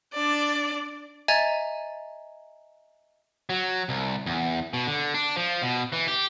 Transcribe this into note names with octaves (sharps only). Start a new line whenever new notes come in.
D4 D5
D#5 E5 G#5 A#5 G#6 A6
F#3
C2
E2
B2
D3
D4
F3
B2
E3
G4